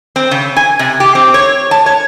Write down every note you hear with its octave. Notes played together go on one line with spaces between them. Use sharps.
C4
C#3
G#5
C3
G4
C4
C#5
A5
C#5